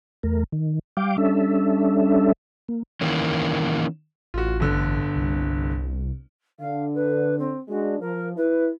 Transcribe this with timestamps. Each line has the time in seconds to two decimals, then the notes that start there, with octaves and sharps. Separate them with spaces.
0.23 E2 A3 A#4
0.52 D#3
0.97 G3 F5 G5 D6
1.18 G3 C#4 D4 A4 E5
2.69 A#3
3.01 D#3 E3 A#3 C#4
4.34 A1 F4 F#4
4.60 G1 D3
5.16 C2
6.59 D3 F5
6.94 B4
7.39 C4
7.69 G#3 D4 F#4
8.00 F3 A#4
8.37 E4 B4